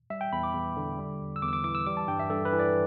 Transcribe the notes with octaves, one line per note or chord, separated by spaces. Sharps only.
G3 E5
G5
E2 B5
D6
E2
D3
G3
E2
E6
E2 D6
E6
D6
E3 D6
E6
G3 D6
A5
G2 G5
E5
G2 A4
B4
E3
D5